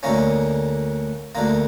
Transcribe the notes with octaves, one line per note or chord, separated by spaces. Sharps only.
D2 D3 A#3 C#4
D2 D3 A#3